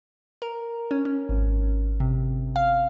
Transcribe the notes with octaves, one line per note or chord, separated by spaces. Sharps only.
A#4
C#4
C#4
G#1
C3
F5